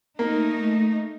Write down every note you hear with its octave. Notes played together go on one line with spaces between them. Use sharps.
A3 A#3 D#4